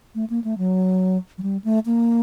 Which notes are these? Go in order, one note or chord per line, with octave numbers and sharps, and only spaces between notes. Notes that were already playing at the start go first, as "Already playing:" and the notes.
A3
A#3
A3
F#3
F#3
G3
A3
A#3